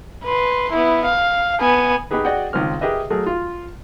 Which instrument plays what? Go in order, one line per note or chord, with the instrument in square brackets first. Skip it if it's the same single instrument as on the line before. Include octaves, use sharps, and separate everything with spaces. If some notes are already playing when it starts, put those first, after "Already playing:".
[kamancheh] B4 C6
B3 E4
F5
B3 G#5
[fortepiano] B3 D#4 G4 G#4 B4
F#4 G#4 D5 D#5 F#5 G5
C#2 D#3 C4 F6
G4 G#4 A#4 B4 D#5 E5
F#3 A3 G#4 A#4
F4